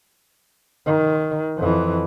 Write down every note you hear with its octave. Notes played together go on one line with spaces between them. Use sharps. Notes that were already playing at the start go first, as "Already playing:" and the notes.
D#3
F2 E3